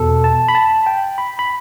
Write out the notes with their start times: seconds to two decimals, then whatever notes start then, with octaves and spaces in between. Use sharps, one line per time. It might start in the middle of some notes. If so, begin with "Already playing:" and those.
Already playing: E2 B2 A4
0.24 A5
0.49 B5
0.55 A5
0.86 G5
1.18 B5
1.39 B5